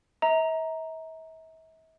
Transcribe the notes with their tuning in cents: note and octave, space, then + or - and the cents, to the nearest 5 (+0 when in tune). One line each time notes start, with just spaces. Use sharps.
E5 -40 A#5 +0